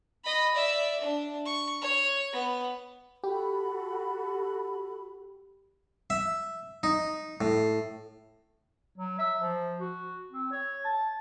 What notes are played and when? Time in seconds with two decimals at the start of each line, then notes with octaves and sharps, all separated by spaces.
0.24 D#5 B5
0.55 D5 E5
1.01 D4
1.46 C#6
1.81 C#5
2.33 B3
3.24 F#4 G4 A4 B5
6.10 E5
6.83 D#4
7.41 A2
8.98 F#3
9.19 E5
9.40 F3
9.80 F#4
10.32 C4
10.52 C#5
10.85 A5